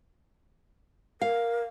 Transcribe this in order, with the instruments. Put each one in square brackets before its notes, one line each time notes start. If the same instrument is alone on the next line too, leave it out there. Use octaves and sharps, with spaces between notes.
[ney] A#4 [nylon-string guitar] F5